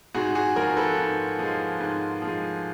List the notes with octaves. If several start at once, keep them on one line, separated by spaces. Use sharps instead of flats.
G#2 F#4 G#4
F#4 G#4
F3 G#3 G#4 A#4
A4 B4
G#2
F3 G#3
G#2
F3 G#3